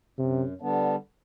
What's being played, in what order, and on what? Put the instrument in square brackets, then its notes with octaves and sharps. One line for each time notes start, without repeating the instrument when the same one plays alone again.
[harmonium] F#2 [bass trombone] C3
[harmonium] D3 G3 B3 D4